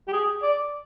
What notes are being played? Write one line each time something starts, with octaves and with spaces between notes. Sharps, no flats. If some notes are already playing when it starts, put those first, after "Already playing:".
G4
G#4
D5